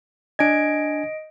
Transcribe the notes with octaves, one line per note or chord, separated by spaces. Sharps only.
D4 D#5 G#5 G#6 D7